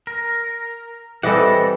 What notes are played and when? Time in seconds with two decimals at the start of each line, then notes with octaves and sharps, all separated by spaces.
0.07 A#4
1.23 E3 G3 C4 A4 D5 D#5 F#5